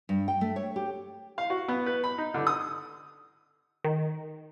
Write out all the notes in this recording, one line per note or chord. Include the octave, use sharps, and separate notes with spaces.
G2
G5
A3
C#5
G4
F5
F#4
B3
B4
B5
D#4
D3
D#6
D#3